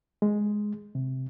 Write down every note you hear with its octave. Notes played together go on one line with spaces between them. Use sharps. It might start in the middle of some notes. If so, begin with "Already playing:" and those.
G#3
C3